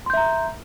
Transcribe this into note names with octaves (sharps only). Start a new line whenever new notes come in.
E5 A#5 C6 G6